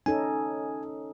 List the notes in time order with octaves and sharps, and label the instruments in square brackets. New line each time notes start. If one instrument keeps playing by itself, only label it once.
[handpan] C#4 D#4 A4 [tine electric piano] G#5